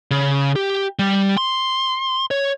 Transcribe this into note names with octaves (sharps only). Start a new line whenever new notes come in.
C#3
G4
G3
C6
C#5